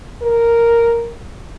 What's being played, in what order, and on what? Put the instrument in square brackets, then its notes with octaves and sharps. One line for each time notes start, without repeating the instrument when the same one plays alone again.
[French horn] A#4